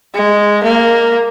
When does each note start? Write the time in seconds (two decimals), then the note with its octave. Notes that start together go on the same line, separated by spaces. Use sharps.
0.14 G#3
0.64 A#3